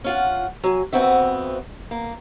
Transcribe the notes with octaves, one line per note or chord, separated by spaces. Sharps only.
C#4 F4 F#5
F#3 G#5
F2 G#2 B3 C4 F#4 E5
A#3